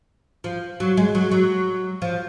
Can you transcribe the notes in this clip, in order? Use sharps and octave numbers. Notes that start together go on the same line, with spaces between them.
F3
F#3
G#3
F#3
F#3
F3